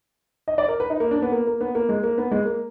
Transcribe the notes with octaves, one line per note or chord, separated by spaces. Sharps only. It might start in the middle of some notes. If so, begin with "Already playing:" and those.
D#5
D5
A#4
B4
D#4
A#3
D4
B3
A#3
A#3
B3
A#3
G#3
A#3
B3
G#3
A#3